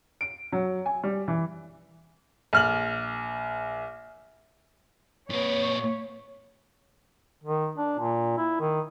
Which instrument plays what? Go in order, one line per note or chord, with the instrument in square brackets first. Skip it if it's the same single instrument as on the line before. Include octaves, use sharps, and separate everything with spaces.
[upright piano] D7
F#3
G#5
G3
E3
A#1 F6 F#7
[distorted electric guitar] A#2 B4 [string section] C#5
[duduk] D#3
D4
A#2
E4
D#3